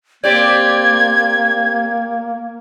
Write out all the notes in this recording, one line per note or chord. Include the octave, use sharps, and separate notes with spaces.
A#3 C4 G4 D5 G#6